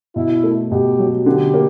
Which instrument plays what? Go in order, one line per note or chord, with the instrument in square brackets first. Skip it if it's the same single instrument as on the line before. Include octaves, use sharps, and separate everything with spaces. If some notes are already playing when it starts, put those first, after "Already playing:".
[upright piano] B2 [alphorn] E4
[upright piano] A3
[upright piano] B2 [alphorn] G4
[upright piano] F#3
[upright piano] D3 [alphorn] G4
[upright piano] A#3